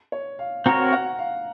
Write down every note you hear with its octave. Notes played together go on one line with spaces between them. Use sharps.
C#5
F5
C4 F#4 A#4 C#5 A#5
F#5
F5